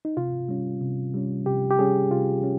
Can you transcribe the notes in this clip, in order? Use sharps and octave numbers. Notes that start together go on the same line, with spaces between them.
D#4
C3 F4
G3 C#4
C3
G3 C#4
C3 G4
G4
G3 C#4 G#4
C3 F4
C#4